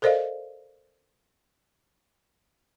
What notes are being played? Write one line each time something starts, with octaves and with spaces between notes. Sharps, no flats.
A4 A#4 C5 D5 D#5 F5